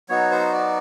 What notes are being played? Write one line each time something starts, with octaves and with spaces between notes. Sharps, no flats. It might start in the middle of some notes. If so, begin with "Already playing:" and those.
F#3 B3 D#4 F#4 C#5
C5
D5